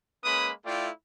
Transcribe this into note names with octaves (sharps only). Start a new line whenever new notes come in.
G#3 A#3 C#4 B4 B5 D#6
A3 E4 F4 D5 F5 G5